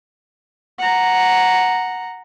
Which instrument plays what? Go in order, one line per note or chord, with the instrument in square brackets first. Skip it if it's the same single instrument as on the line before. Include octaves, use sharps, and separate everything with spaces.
[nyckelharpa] F#5 A#5